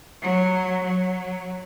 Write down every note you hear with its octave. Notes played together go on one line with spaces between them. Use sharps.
F#3
F#3